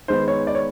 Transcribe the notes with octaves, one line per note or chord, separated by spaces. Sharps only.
D#3 G#3 B3 C5
C#5
D5
C#5